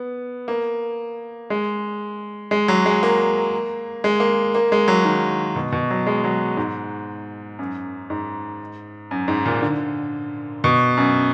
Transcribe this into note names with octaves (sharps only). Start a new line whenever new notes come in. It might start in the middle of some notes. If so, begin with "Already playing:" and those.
Already playing: B3
A#3
G#3
G#3
F#3
G#3
A#3
G#3
A#3
A#3
G#3
F#3
D#3
B2
B2
F#3
G#3
F#3
G#2
F#2
G#2
F#2
G#2
A#2
D3
B2
F#2